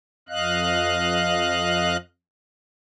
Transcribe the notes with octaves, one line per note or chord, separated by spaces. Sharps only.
F2 D#5 F5 F#6